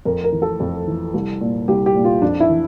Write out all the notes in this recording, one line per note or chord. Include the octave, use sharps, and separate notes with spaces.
F2 A#4
A#4
E3
A4
F2
E3
C2
A#2
C2 G4
G4
A#2
F4
F2 D4
E4
E3